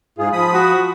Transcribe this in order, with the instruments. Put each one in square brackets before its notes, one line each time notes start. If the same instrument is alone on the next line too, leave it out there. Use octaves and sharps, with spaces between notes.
[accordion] G#2 G#4 [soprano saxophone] F4
[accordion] F3 B5 D#6
[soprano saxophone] F#4